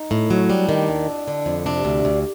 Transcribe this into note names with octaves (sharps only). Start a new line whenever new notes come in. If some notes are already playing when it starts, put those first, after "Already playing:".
Already playing: D#4
A2
F#3
G3 D4
D#3
D#2
F2
D3
F2
C3 D4
D2
D2